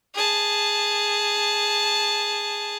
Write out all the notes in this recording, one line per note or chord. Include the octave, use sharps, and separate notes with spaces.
G#4 A5